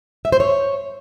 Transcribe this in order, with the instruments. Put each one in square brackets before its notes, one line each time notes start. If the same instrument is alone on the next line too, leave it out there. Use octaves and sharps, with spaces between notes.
[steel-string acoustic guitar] E5
C5
C#5